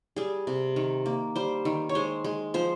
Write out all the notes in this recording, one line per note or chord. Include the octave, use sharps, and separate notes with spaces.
G3 G#4
C3
D#3
A#3
G3 C5
D#3
C#5
G#3 C5
G#3
F3 C5